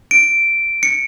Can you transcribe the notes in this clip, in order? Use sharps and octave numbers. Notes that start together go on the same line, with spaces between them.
D7
C#7